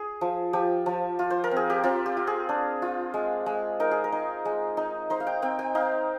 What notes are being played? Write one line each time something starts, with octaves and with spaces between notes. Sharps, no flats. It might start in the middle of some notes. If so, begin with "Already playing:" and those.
Already playing: G#4
F3
F3 G4
F3
F4
C5
A#4
C4
G#4
G4
C4 F4
G4
F4
G#4
D4
F4
G#3
G#3
D#4 A#4
G#4
A#4
D#4
G#3
D#4
D#4 C5
F5
G5
C4 G5
G5
D#4 F5